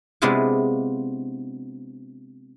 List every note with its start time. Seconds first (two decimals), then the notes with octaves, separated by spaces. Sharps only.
0.22 C3 G#3 B3 D4 E4 F4